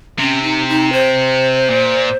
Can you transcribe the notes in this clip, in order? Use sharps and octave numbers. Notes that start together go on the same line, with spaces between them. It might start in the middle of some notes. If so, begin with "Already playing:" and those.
C3 C#4
D#4
D#4
C5
A#2